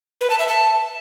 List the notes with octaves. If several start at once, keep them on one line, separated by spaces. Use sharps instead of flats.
B4
A5
E5
A5